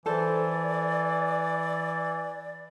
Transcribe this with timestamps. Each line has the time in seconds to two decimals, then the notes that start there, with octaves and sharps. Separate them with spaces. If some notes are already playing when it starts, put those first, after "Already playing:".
0.06 E3 A4 C5 D5